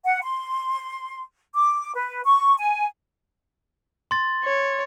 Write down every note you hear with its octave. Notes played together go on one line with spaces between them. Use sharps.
F#5
C6
D6
B4
C#6
G#5
C6 A6
C#5